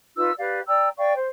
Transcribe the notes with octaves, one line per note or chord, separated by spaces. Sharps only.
D#4 F4 B4 E6
G4 B4 D5 F5
D5 G5 A#5 E6
D5 F5 G5 C#6
C5